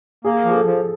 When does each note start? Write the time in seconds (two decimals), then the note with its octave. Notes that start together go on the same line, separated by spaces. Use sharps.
0.25 A#3 G#4
0.45 F3
0.51 G#4
0.55 A4
0.65 F3